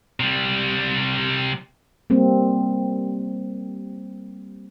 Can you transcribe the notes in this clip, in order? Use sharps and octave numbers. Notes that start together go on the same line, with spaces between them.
C3 G3
G3 A#3 C4